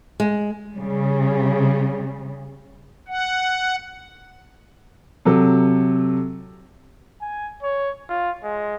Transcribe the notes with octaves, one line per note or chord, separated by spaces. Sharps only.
G#3
C#3 G3
F#5
C3 F#3 A4
G#5
C#5
F4
G#3